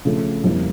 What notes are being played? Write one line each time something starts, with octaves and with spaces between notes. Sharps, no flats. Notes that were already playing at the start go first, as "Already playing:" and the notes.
C#3 F3 A3
F2 C#3 G3 A#3 E4